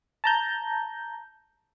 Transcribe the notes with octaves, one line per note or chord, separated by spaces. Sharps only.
A5 A#5 G6